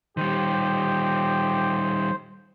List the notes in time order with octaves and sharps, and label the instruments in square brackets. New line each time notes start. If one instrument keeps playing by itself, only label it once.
[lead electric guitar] D#3 G3 [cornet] G4 [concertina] C5